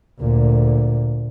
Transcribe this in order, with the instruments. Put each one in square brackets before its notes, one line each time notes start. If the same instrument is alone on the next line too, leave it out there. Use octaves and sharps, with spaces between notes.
[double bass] D2 A#2